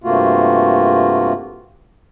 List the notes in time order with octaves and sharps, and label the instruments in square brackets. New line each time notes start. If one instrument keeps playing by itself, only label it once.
[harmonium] G2 C3 A3 A#3 F4 F#4